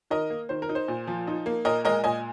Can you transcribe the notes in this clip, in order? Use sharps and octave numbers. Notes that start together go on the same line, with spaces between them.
D#3 A#4 D#5
A#3
D#3 C5
A#4
D#4
C5
A#2
F3
D#4
A#3
A#2 A#4 D#5
G#3 A#4 D#5
A#2 D#5 G#5